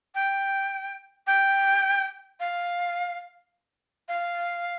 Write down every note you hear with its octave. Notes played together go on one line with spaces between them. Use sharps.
G5
G5
F5
F5